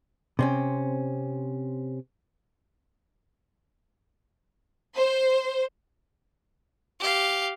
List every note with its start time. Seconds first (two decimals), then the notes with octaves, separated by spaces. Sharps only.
0.39 C3 C4 C#4
4.96 C5
7.00 G4 F5